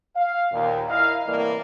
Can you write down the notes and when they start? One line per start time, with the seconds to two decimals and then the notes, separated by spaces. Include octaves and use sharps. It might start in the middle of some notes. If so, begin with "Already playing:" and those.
0.15 F5
0.52 D#2 A#2
0.89 E4 A#4 D#5 F5
1.26 C2 A2 E3 A#3 D5